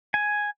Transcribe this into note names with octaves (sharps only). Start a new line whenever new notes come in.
G#5